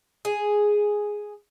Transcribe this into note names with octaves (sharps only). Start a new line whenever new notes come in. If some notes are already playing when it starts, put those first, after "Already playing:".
G#4